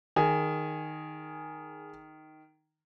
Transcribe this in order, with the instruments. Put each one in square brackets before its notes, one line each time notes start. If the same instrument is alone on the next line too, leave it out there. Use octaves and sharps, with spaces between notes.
[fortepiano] D#3 [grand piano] G#4 A#4 G#5